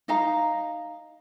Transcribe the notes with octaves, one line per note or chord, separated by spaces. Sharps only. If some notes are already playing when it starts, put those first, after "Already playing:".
D#4 D#5 F5 A#5